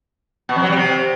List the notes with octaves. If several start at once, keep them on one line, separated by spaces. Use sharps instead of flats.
B2
F2
F#3
G3
C3